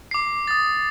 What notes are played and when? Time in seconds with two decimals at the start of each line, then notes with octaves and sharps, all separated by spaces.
0.11 D6 C7
0.48 D#6 A6